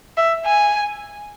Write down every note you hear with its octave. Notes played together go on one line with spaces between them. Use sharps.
E5
G#5